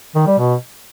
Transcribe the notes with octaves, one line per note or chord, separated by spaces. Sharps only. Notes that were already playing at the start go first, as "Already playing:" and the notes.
D#3
G3
B2